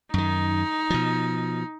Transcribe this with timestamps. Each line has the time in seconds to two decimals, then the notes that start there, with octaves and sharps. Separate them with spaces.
0.14 F#2 D#3 D#4
0.90 B2 F3